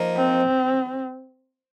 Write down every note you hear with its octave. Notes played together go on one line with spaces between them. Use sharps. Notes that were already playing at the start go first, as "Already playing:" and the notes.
Already playing: F3 A#3 D#4
C4